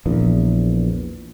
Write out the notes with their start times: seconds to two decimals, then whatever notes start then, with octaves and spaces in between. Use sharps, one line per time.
0.06 A#1 E2 A#2